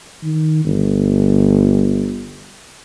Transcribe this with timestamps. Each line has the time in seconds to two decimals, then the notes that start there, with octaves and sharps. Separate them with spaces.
0.23 D#3
0.65 G1